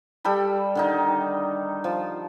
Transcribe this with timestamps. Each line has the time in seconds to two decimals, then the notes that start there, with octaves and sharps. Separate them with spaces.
0.24 G3 A4 G5 B5
0.75 D3 D#3 D#4
1.84 F3